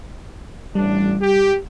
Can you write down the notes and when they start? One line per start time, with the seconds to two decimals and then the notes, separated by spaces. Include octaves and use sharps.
0.75 A1 G3 D4
1.21 G4